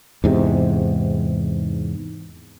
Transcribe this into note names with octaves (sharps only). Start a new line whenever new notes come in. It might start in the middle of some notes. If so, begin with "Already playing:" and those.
E2 G#2 C3